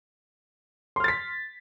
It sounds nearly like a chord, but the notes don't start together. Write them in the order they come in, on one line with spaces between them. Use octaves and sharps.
C6 F6 A6 B6